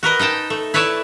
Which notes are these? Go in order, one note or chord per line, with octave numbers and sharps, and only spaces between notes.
F#4 A#4 B4 D#5
D#4 D#5 G5 A5
A3
E4 B4 C#5 D5 E5